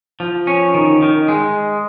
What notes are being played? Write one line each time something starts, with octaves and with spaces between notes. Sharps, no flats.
F3
C#4
D#3
D#3
G#3